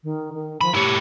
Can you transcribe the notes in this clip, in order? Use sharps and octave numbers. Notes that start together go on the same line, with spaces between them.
D#3
D#3
F3 B5
E4 G4 C#5